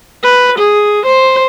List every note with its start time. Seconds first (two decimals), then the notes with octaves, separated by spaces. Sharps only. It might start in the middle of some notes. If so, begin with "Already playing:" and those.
0.24 B4
0.58 G#4
1.06 C5